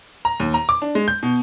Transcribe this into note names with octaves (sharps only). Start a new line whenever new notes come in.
A#5
D#2
A#5
D6
D4
G#3
G6
B2